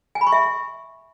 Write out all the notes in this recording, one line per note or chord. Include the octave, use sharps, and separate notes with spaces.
G#5
B5
C#6
E5